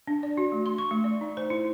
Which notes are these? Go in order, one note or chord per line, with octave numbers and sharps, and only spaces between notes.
D4
D5
F#4
A3
C6
C#6
A3
D5
D#4
C5
E4